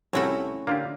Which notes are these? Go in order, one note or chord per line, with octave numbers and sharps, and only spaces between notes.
C2 A3 C4 C#4 E4 F#4 A4
D3 A#3 F4 G4